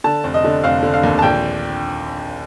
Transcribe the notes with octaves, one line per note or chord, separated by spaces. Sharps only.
D3 A5
F1
D#5
D3
F1 F5
D3
F5
D#2
A5
A#1 G5